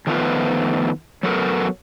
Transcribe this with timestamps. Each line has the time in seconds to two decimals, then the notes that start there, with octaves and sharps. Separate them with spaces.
0.07 D#3 F3 A3 B3 F4 B4
1.23 F#3 A3 B3 F#4 A4 A#4